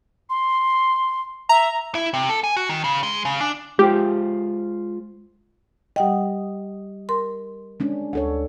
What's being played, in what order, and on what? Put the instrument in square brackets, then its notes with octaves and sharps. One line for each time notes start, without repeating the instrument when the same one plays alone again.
[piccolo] C6
[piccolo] E5 [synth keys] A#5
[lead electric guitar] E4
C3
A4
G#5
F#4
D#3
C#3
G#3
C#3
D4
[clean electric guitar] G#3 F4 C5 [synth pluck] G4
[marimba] G3 F#5 G5 [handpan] G4 D#5
[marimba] A#4 C6
[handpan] G#3 C#4 D4
[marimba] D2 [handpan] D4 A4 C#5